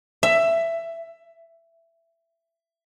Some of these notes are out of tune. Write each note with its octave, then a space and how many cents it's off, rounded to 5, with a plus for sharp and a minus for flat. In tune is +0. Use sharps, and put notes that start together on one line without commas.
E5 +15